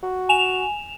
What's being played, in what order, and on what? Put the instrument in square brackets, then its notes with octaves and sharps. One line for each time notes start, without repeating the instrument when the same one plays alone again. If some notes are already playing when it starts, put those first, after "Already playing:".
[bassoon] F#4
[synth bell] G#5 E7 F7